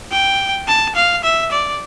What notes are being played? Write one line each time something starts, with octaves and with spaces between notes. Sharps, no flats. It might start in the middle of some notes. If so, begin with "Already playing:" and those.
G5
A5
F5
E5
D5